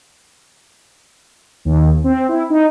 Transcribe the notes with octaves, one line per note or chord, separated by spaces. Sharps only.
D#2
C4
E4
D#4